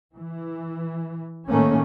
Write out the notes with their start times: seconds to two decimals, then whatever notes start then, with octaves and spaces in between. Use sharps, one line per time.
0.14 E3
1.48 A2 D#3 A3 A#3 C#4